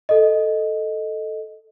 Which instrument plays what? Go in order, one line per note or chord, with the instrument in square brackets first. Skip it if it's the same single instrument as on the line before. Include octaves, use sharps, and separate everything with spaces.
[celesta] A4 D#5